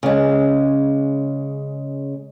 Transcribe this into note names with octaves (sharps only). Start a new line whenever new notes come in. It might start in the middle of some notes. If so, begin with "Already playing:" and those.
C#3 G#3